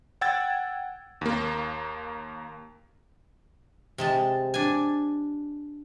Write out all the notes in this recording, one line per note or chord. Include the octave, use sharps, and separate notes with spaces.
F#5 G5 E6 G#6 A6
D#2 A#3
C3 G#3 A5
D4 G#5